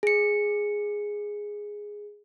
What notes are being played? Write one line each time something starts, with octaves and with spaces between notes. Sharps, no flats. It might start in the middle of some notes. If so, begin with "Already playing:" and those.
G#4 C#7